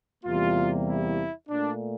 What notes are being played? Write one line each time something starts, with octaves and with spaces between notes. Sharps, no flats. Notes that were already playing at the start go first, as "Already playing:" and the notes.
E2 C3 G3 A#3 F4
E4
A#2 A3 D4